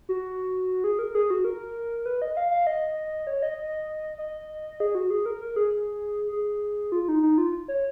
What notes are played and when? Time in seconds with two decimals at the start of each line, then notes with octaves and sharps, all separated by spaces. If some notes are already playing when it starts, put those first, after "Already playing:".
0.09 F#4
0.84 G#4
0.99 A#4
1.15 G#4
1.30 F#4
1.44 A#4
2.06 B4
2.22 D#5
2.37 F5
2.51 F5
2.67 D#5
3.27 C#5
3.42 D#5
3.59 D#5
4.18 D#5
4.80 G#4
4.95 F#4
5.10 G#4
5.26 A#4
5.41 A#4
5.56 G#4
6.32 G#4
6.92 F4
7.08 D#4
7.23 D#4
7.38 F4
7.68 C#5